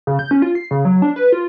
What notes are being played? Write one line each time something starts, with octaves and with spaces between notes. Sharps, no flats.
C#3
G6
C#4
F4
C7
C#3
F#3
D4
B4
F4